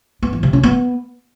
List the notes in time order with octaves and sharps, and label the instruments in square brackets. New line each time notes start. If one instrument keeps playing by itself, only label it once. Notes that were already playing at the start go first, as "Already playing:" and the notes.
[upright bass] B3
E3
C3
C#4
B3